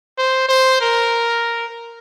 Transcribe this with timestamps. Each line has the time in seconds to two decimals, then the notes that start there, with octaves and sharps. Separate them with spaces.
0.18 C5
0.49 C5
0.81 A#4